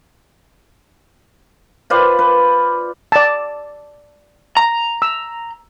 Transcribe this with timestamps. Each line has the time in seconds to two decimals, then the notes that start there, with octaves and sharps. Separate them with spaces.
1.90 F4 B4 C5 D5
2.19 B4
3.12 D5 A5
4.57 A#5
5.02 E6